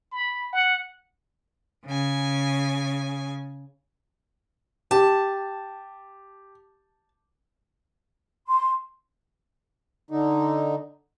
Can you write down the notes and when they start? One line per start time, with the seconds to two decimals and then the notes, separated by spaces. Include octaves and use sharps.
0.12 B5
0.53 F#5
1.86 C#3 G#5
4.91 G4 A5
8.48 C6
10.11 D3 D#4